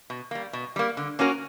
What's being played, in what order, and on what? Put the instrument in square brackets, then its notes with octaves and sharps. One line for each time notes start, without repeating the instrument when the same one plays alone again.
[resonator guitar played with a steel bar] B2
G3 A#3
B2
G3 A#3
D3
A#3 C#4 F#4 A#4